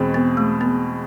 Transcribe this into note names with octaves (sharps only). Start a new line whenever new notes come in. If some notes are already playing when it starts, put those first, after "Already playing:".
Already playing: E2 B2 G#3 C4
B3
A3
B3